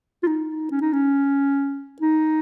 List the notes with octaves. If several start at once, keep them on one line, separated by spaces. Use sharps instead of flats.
F4
D#4
C#4
D#4
C#4
D#4